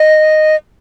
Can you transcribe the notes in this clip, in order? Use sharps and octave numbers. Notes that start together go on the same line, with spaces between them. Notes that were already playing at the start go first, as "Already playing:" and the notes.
Already playing: D#5